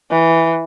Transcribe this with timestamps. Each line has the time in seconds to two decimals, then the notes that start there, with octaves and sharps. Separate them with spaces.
0.11 E3